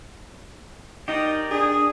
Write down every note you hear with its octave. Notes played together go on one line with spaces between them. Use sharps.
D#4 G4 A#4 D5
D4 G#4 D#6